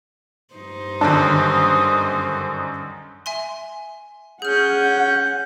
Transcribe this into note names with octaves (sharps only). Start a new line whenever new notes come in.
G2 D#4 C5
F#2 D3 D#3 D4 D#6
E5 G#5 C6
C#4 G#4 F#5 F6 G6